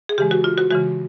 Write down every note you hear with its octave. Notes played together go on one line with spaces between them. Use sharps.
G#4
C#3 E3 G#3 G4
F#4
F4
F#4
C#3 E3 G#3 F#4